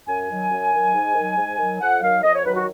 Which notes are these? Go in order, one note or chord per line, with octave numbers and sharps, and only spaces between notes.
F#2 G#5
D#3 F#3
F#2
D#3 F#3
G#2
D#3 F#3
G#2
D#3 F#3
F2 F#5
D#3 F#3 F5
F2 D#5
C#5
D#3 F#3 B4
F#4